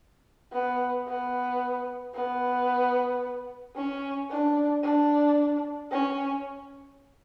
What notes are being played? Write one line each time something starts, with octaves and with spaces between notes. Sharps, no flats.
B3
B3
B3
C#4
D4
D4
C#4